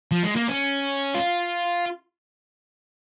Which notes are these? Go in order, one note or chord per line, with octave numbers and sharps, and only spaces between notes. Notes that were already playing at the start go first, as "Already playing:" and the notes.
F3
G#3
A#3
C#4
F4